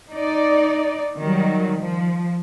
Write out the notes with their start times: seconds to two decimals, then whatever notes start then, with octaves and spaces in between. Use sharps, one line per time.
0.12 D#4 D5
1.19 D#3 F#3 G3
1.79 F3